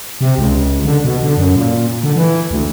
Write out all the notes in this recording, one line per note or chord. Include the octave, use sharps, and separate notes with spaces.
C3
C#2
D3
B2
D3
F#2
A#2
D3
E3
D2